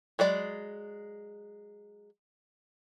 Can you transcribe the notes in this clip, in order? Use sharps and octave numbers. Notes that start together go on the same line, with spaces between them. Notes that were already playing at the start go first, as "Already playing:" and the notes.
F#3 G#3 D5 B5